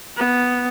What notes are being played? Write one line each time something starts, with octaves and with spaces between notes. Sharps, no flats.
B3